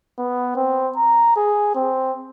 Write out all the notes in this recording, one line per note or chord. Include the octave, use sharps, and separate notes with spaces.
B3
C4
A#5
G#4
C4